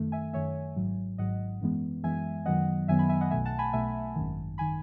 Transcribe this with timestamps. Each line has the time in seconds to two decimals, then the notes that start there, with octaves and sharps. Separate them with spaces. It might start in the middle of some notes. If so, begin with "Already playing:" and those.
Already playing: F#2 D#3 A3
0.12 E5 G#5
0.33 F#2 D#3 A3 C#5 E5
0.76 G#1 G#2 F#3
1.18 G#1 G#2 F#3 D#5 F#5
1.61 F#2 E3 G#3 B3
2.03 F#2 E3 G#3 B3 E5 G#5
2.45 F#2 D#3 F#3 B3 D#5 F#5
2.88 F#2 D#3 F#3 B3 E5 G#5
2.99 G#5 B5
3.09 E5 G#5
3.21 D#5 F#5
3.31 B1 B2 A3 E5 G#5
3.45 F#5 A5
3.59 G#5 B5
3.73 B1 B2 A3 E5 G#5
4.16 G#1 F#2 D#3
4.58 D#3 G#5 B5